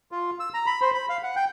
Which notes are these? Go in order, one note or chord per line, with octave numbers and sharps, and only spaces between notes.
F4
E6
A#5
B5
C5
B5
F5
F#5
G5